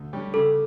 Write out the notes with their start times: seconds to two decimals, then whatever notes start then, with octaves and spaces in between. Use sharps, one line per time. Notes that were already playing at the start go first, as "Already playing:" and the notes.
Already playing: D2
0.13 D3 G3 C#4 G4
0.34 C#3 A4